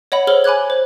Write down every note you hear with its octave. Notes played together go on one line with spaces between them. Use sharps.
C#5 D#5 F#5 B5
G#4 A4 C5 C#5 F6 G7
G#5 B5 D6 F#6 G#6
C5